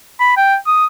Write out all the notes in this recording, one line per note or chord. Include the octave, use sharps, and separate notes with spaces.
B5
G5
D#6